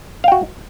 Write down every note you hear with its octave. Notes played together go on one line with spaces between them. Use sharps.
F#4 F5 G5